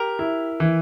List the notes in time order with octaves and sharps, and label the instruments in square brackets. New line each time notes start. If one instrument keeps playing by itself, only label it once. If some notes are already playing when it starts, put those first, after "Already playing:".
Already playing: [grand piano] G4 [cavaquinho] A#4
[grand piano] E4
E3